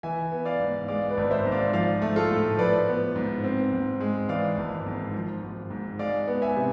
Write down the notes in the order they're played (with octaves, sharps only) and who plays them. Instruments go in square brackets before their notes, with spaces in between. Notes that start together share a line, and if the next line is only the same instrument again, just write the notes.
[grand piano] E3 E5 G#5
B3
D5 F5
G#2
G#3 D5 F5
B4 D5
G#1
C5 E5
G#2
D5 F5
F3 D5 F5
A3
F4 A4
A2
F3 B4 D5
B3
G#2
C4
G#2
G#3
E3 D5 F5
G#1
G#2
F3
G#1
G#2
G#3 D5 F5
B3
E5 G#5
C3